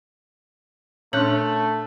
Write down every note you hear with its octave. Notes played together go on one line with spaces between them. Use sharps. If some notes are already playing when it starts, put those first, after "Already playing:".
A#2 A3 C#4 D4 C6 F#6 G6 F#7